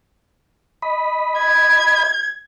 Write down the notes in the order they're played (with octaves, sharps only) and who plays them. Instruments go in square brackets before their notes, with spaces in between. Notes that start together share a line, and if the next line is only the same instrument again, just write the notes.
[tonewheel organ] D#5 B5
[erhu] G#6